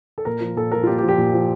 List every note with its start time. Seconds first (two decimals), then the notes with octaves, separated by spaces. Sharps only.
0.18 A4
0.25 A#2 A#4
0.41 F3
0.56 A#2 A4
0.72 F3 A#4
0.83 F4
0.87 A#2 G4
0.98 G4
1.03 F3
1.08 G4
1.18 A#2
1.34 F3